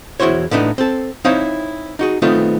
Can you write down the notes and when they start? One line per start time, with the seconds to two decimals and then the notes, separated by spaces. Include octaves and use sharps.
0.20 E2 E4 F#4 C5 C#5
0.51 A2 A3 B3 D4 D#4
0.78 C4 A4
1.25 C4 D#4 E4 C5 C#5 F5
1.99 D#4 F#4 G#4
2.22 D#3 A3 B3 C4 D#4 F4